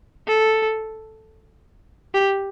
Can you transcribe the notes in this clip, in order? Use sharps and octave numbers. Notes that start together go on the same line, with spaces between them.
A4
G4